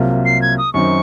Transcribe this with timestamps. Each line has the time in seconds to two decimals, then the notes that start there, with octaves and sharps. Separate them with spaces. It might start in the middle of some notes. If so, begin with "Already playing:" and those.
Already playing: C2 C3 F#3 A#3 F4
0.26 C7
0.42 G#6
0.58 D#6
0.73 F#2 D#3 F#3 C4 D#4 C#6